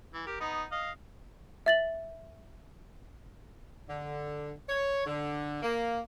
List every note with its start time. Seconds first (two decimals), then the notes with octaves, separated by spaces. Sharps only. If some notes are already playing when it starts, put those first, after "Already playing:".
0.14 E3
0.26 G4 A#4
0.40 B3 D#4 A#5
0.71 D#5 F5
1.66 E5 A6 F#7
3.90 D3
4.68 C#5
5.07 D3
5.63 A#3